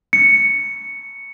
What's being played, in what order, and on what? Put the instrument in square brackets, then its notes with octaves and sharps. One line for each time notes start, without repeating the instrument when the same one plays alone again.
[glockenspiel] C#7